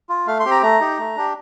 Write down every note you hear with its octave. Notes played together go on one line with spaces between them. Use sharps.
F4
A3 F5
C6
C4 G4
A#5
A3 A#5
D#4 G4
A3
D4 G4